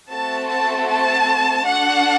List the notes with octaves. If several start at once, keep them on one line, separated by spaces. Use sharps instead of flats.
A3 C4 F#4 A4 A5
A5
A5
D4 F#4 A4 F#5